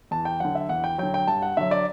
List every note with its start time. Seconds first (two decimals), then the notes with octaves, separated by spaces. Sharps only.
0.11 E2 A5
0.25 G5
0.40 D3 F#3 F#5
0.55 E5
0.69 E2 F#5
0.84 G5
0.98 D3 F#3 G5
1.14 G5
1.28 G2 A5
1.42 F#5
1.57 D3 F#3 E5
1.71 D5